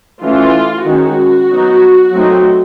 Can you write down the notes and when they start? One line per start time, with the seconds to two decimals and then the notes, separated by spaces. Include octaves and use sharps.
0.23 E3 A3 C#4 F4
0.86 D#3 G#3 C#4 F#4
1.49 F#3 B3 D#4
2.12 F#3 A3 C4 D#4